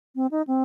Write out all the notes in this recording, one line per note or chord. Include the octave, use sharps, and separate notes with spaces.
C4
D#4
C4